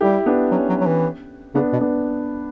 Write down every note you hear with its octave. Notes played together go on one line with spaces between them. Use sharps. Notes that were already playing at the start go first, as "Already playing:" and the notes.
G3 E4 G4
B3 D4
F#3 C#4
F#3
F#3
E3
C#3 B3 D4
B2
B3 D4